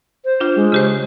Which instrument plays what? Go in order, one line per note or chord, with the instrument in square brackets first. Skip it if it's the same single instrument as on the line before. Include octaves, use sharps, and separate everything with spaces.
[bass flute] C5
[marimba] D4 F4
[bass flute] G#3
[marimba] C#3 G4 C5